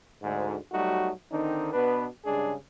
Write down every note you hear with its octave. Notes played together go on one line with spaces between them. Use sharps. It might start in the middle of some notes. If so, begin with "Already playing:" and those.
D2 G#2
F#3 G3 A3 D#4 F#4
D3 D#3 C4 D4 D#4
B2 B3 D4 B4
G2 C#3 G#3 D4 G#4